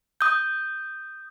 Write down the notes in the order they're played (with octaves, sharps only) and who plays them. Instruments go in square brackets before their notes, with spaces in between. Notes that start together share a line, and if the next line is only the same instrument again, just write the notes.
[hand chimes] D#6 G6